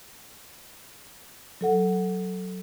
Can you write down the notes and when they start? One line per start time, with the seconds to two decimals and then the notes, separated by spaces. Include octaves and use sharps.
1.61 F#3 A4 F#5